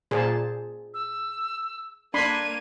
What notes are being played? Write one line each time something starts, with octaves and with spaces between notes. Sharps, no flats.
A#2 G#4 C5 A5
E6
A#3 D4 B5 C6 G#6 D#7